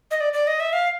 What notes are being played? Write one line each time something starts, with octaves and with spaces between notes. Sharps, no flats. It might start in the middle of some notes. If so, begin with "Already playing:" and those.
D#5
D5
D5
D#5
E5
F5